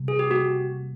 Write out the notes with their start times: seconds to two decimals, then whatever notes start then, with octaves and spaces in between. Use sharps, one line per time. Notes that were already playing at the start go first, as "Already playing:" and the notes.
Already playing: C3 G3
0.08 G#4
0.19 G4
0.30 A#3 F#4